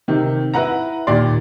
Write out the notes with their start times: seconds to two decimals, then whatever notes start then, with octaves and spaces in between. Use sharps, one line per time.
0.08 C3 D#3
0.54 E4 B4 F#5 A#5
1.07 D#2 A#2 G4 D5 C6